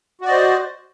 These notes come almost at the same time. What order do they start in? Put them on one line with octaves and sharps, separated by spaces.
F#4 D5 D#5 C5